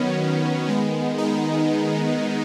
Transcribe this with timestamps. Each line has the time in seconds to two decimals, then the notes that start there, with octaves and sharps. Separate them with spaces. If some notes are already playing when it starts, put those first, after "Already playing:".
Already playing: D#3 F#3 B3 C#4
0.67 D#3 G#3 B3
1.18 D#4